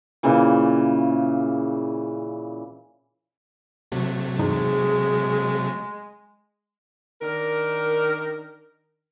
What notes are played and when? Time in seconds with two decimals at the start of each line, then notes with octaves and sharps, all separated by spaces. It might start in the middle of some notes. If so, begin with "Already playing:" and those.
0.23 A#2 C#3 E3
3.92 C3 F#3 A3
4.39 E2 G2 G#3 D#4 G#4
7.22 D#3 D4 A#4